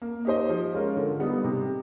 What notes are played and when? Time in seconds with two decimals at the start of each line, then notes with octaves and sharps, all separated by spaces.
0.02 A#3
0.25 D#4 G4 C5 D#5
0.49 F3
0.73 G#3 C#4 F4 A#4
0.97 D3
1.20 G3 B3 D#4
1.44 C3